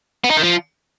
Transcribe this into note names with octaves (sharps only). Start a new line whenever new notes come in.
B3
D#4
D#3
F3